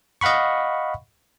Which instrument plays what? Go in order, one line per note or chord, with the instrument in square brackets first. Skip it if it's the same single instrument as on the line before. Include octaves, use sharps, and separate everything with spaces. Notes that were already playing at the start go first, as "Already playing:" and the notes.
[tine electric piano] D#5 F5 F#5 B5 C#6